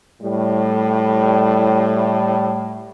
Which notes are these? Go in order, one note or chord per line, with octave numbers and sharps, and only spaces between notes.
A2 G3